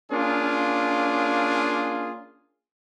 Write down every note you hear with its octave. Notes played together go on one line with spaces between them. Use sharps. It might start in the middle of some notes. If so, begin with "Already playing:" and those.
A#3 C#4 D4 F4 G#4